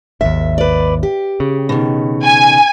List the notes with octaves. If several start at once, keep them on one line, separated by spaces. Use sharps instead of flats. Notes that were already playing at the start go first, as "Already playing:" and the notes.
G#1 D#2 E5
B4 D5
G4
C#3
B2 D#3
G#5